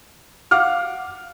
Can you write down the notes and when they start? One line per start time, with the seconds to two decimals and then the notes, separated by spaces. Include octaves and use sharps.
0.51 F5 F#5 D6 F6